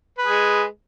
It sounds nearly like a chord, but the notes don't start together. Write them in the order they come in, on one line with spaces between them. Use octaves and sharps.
B4 G#4 G#3